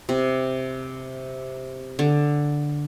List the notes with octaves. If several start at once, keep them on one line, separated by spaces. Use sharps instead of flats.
C3
D3